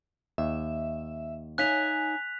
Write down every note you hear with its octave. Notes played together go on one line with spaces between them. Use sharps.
D#2 E5
D#4 C#5 F5 G#5 F#6 B6 F7